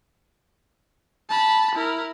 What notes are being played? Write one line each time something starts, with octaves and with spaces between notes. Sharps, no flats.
A5 B5
E4 A#4